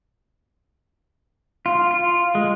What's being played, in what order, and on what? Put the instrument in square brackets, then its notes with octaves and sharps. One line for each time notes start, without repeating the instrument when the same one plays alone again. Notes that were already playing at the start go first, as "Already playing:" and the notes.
[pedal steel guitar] F4
F4
G#3